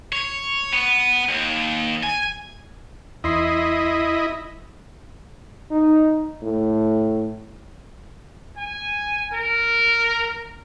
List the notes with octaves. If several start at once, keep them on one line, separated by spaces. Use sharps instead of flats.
C#5
B3
D#2
G#5
E2 E4 D#5 C6 C7
D#4
A2
G#5
A#4